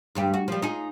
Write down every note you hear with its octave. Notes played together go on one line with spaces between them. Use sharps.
D2 G2 G4
F#4
F3 G3
D#4 F4 G#4